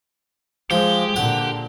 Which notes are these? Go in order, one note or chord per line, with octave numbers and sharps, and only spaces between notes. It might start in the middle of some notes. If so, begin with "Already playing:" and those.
F3 G#3 G4
A#2 D3 F#5